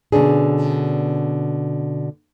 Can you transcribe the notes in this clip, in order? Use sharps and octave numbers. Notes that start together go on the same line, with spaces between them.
B2 D3 C#4 D4 G#4